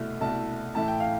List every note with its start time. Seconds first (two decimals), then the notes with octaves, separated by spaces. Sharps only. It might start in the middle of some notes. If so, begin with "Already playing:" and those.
Already playing: C2 B2 A3 E4
0.21 C2 B2 A3 E4 A5
0.75 A2 E3 A3 E4 A5
0.88 G5
1.00 F5